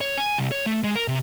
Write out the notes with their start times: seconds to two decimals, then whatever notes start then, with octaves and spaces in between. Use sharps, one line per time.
0.01 C#5
0.18 G#5
0.38 C2
0.51 C#5
0.66 A3
0.84 G#3
0.96 A#4
1.08 C3